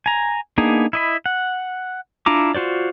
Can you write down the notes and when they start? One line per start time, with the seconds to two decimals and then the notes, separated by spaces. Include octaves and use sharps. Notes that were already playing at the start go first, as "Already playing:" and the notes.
0.06 G#5 A#5
0.58 A#3 B3 D4 D#4 G#4
0.93 E4 D#5 B5
1.26 F#5
2.26 D4 E4 F4 A#5 D6
2.55 F4 F#4 C5 D5